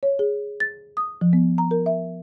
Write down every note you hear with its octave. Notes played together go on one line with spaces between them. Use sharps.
C#5
G#4
A6
D#6
F3
B3
A#5
A#4
E5